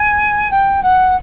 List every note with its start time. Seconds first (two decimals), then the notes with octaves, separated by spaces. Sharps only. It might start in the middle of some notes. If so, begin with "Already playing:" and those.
Already playing: G#5
0.51 G5
0.83 F#5